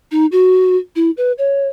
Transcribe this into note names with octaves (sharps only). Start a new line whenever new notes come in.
D#4
F#4
E4
B4
C#5